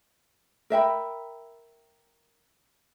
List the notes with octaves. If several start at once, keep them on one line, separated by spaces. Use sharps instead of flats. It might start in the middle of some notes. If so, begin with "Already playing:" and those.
A#4 E5 G5 B5